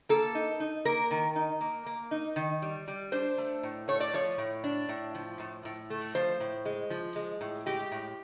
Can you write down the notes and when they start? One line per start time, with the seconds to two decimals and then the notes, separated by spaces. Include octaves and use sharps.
0.09 A#3 A4
0.35 D#4
0.60 D#4
0.85 A#3 A#4
1.11 D#3
1.36 D#4
1.61 A#3
1.86 A#3
2.11 D#4
2.36 D#3
2.62 G3
2.88 G3
3.12 D4 C5
3.38 A3
3.63 A2
3.88 A3 C#5
4.00 D5
4.13 F3 C#5
4.38 A2
4.64 D4
4.89 A2
5.15 F3
5.40 A2
5.65 A2
5.90 A3
6.15 F3 C5
6.40 A2
6.65 G#3
6.90 F3
7.16 G#3
7.41 A2
7.66 G#3 G4
7.92 A2